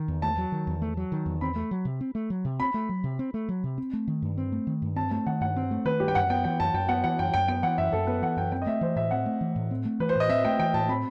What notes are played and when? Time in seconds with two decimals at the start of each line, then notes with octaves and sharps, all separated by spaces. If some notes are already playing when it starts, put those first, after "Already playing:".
Already playing: D#3
0.08 E2
0.22 A3 A5
0.38 F#3
0.52 D#3
0.67 E2
0.82 A3
0.97 F#3
1.12 D#3
1.26 E2
1.41 C4 B5
1.56 A3
1.71 F#3
1.85 C3
2.01 C4
2.15 A3
2.30 F#3
2.45 C3
2.60 C4 B5
2.74 A3
2.89 F#3
3.04 C3
3.19 C4
3.34 A3
3.49 F#3
3.64 C3
3.78 C4
3.93 A3
4.08 D#3
4.22 G2
4.38 C4
4.52 A3
4.67 D#3
4.82 G2
4.96 C4 A5
5.11 A3 A5
5.26 D#3 F#5
5.41 G2 F#5
5.56 C4
5.71 A3
5.85 D#3 B4
6.00 G2 G4
6.08 G5
6.15 F#2 F#5
6.30 B3 G5
6.44 E3 G5
6.60 F#2 A5
6.74 F#2 G5
6.89 B3 F#5
7.04 E3 F#5
7.19 F#2 G5
7.34 F#2 G5
7.48 B3 G5
7.63 E3 F#5
7.78 F#2 E5
7.92 F#2 A4
8.07 B3 B4
8.22 E3 F#5
8.37 F#2 G5
8.52 C4 G5
8.62 D#5
8.66 A3 E5
8.81 E3 C5
8.96 A2 E5
9.11 C4 F#5
9.26 A3
9.41 E3
9.56 A2
9.71 C4
9.85 A3
10.00 E3 B4
10.09 C5
10.16 A2 D#5
10.29 C4 E5
10.45 A3 G5
10.59 E3 G5
10.74 A2 A5
10.89 C4 B5